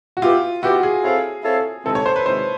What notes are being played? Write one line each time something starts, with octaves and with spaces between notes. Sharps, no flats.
F#4
B3 E4 F4 G4
B3 E4 F#4 G4
G#4
C4 E4 A4 C#5 F5
C4 E4 A4 C#5 F5
C3 D#3 G#3 C4 E4 A4
C#5
C5
B4
C3 D#3 G#3 C4 E4 C5